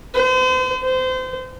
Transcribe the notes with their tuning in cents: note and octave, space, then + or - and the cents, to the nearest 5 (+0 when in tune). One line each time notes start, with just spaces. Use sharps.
C5 -40
C5 -30